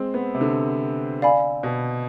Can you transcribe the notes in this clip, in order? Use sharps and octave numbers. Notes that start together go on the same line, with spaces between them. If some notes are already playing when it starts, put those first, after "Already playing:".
Already playing: G#3 C4
B3
C3
D3
D5 F5 G#5 B5
B2